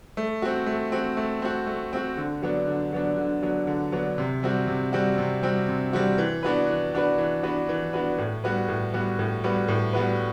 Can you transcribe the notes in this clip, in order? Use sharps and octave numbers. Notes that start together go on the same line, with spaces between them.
A3
C4 F#4
A3
C4 F#4
A3
C4 F#4
A3
C4 F#4
D3
F#3 B3 D4
D3
F#3 B3 D4
D3
F#3 B3 D4
D3
F#3 B3 D4
C3
G3 C4 F#4
C3
G3 C4 F#4
C3
G3 C4 F#4
C3
G3 C4 F#4
E3
B3 D4 F#4 B4
E3
B3 D4 F#4 B4
E3
B3 D4 F#4 B4
E3
B3 D4 F#4 B4
A2
G3 B3 F#4 B4
A2
G3 B3 F#4 B4
A2
G3 B3 F#4 B4
A2
G3 B3 F#4 B4